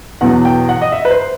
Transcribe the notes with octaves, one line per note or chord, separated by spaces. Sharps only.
E2 B2 F#3 F#5
G5
F#5
D#5
E5
B4
C5